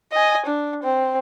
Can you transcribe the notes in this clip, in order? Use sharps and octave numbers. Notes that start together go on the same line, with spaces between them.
D#5 G#5
D4
C4